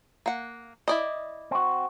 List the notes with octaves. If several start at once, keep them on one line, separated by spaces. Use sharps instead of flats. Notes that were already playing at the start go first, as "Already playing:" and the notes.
A#3 F#5
E4 D5 D#5
C4 F#4